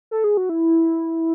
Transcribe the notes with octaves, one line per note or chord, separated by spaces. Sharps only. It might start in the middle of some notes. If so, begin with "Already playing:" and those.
A4
G#4
F#4
E4